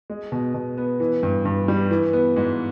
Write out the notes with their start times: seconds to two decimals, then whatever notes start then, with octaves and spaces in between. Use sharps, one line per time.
0.10 G#3
0.32 B2
0.54 B2
0.78 B3
1.00 E3
1.23 G2
1.45 G2
1.68 G3
1.91 E3
2.13 B3
2.36 G#2